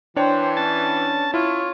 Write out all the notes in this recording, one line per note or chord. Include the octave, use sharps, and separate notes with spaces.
E3 D4 C5 C#5 G5
C#4 A5
E4 F4 C#5